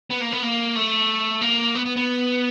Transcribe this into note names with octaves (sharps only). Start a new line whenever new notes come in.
B3
A#3
B3
A#3
A3
A#3
B3
B3
B3